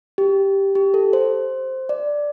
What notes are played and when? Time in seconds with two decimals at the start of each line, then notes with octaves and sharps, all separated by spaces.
0.18 G4
0.75 G4
0.94 A4
1.13 C5
1.89 D5